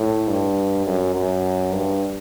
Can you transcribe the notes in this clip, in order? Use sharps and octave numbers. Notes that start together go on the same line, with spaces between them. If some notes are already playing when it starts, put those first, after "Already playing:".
Already playing: A2
G2
F#2
F#2
G2